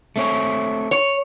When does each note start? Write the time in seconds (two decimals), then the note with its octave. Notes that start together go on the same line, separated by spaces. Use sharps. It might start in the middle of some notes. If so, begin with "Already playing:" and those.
0.16 A3 C4 C#5
0.91 C#5